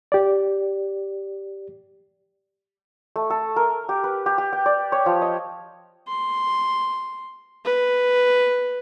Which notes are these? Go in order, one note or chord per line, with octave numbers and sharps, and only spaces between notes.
G4 D5
A3
A4
A#4
G4
B4
G4
G4
G5
D5
C#5
F3
D#5
C6
B4